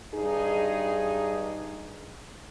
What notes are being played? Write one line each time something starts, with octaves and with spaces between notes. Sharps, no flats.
G2 D#4 G#4